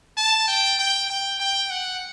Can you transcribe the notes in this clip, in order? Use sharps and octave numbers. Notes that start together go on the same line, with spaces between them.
A5
G5
G5
G5
G5
F#5